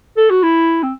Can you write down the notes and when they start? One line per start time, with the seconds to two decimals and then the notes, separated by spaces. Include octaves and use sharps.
0.17 A4
0.30 F#4
0.43 E4
0.83 C4